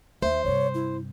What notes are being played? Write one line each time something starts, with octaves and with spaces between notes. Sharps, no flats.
D#2 C5 E5
G2 C3 C#5
E4